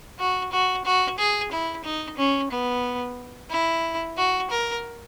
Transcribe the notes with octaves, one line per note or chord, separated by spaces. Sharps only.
F#4
F#4
F#4
G#4
E4
D#4
C#4
B3
E4
F#4
A#4